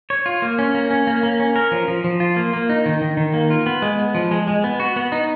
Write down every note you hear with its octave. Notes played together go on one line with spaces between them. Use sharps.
C#5
F4
A#3
C#4
A#3
C#4
A#3
A#3
C#4
A#4
F3
F3
F3
F4
A#3
A#3
D#4
D#3
D#3
D#3
A#3
F4
B3
G#3
B3
F3
G#3
G#3
B3
F#4
B3
D#4